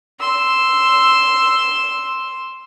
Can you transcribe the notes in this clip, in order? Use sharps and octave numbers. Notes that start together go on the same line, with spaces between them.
C6 E6